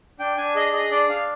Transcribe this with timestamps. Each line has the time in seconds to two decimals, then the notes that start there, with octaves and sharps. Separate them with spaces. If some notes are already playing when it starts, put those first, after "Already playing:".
0.19 D4 G5
0.37 D4 G#5
0.55 G#4 D#5
0.73 G#4 D#5
0.91 D4 D5
1.09 D4 F5